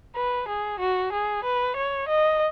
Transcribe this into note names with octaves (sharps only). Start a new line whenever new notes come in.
B4
G#4
F#4
G#4
B4
C#5
D#5